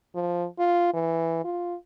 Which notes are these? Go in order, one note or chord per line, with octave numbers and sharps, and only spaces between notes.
F3
F4
E3
F4